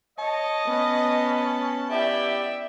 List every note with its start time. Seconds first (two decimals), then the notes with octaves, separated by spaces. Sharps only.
0.19 C#5 D#5 A5
0.67 B3 C#4
1.91 B3 E4 G4 D5 E5 G5